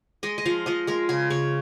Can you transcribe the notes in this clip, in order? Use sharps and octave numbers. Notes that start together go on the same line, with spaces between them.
G#3 D#5
D#5
F3 F5
F3 D#5
G#3 A#4
C#3 G#4
C#3 C#5